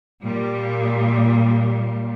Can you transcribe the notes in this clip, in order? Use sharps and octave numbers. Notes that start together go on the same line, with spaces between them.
A#2 G3